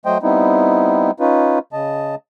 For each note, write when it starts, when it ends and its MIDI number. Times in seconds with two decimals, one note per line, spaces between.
0.06 0.18 54
0.06 0.18 57
0.06 0.18 72
0.06 0.18 75
0.06 0.18 79
0.23 1.11 55
0.23 1.11 59
0.23 1.11 60
0.23 1.11 63
0.23 1.11 64
1.20 1.59 61
1.20 1.59 63
1.20 1.59 65
1.20 1.59 71
1.73 2.15 49
1.73 2.15 75
1.73 2.15 81